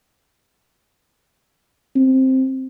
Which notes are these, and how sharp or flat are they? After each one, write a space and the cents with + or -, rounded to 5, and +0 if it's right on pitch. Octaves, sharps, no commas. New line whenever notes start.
C4 +5